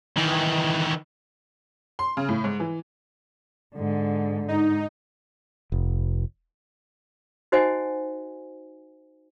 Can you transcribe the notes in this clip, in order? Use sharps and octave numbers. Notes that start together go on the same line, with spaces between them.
D#3 E3
C6
C#3
A2
G#2
E3
G#2 D3
G#2 D#4
F1
D#4 F#4 C5 D#5 F#5 G#5